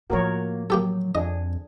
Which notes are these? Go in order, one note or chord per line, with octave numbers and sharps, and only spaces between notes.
A2 F3 A#3 F#4 A#4 C#5
F#3 A#3 G4 A4
F2 D4 G#4 D#5